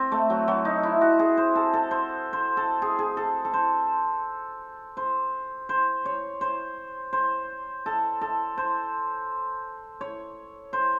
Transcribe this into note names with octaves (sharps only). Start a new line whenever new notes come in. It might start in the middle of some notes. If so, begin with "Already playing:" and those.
Already playing: C4
A3
F#3
F#3
D#4
E4
F#4
G#4
C5
A4
A4
C5
C5
A4
G#4
G#4
A4
A4
C5
C5
C5
C#5
C5
C5
A4
A4
C5
C#5
C5